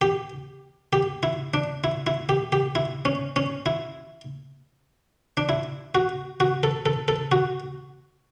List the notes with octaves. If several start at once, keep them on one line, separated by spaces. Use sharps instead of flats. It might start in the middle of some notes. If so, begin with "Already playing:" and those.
G4
G4
E4
D4
E4
E4
G4
G4
E4
C#4
C#4
E4
D4
E4
F#4
F#4
A4
A4
A4
F#4